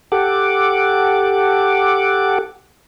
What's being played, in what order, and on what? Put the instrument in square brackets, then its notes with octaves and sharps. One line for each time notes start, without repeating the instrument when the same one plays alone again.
[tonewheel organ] G4 A4 F#5 D6